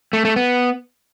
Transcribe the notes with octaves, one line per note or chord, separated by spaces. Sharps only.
A3
A3
B3